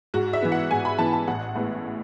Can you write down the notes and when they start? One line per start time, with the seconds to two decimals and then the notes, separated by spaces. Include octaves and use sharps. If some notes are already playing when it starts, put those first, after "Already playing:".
0.14 G#2 F#4
0.33 E5
0.42 E3 B3
0.52 F#5
0.71 G#2 G#5
0.85 B5
0.98 E3 B3 A5
1.13 A5
1.27 A1 F#5
1.56 A2 G#3 B3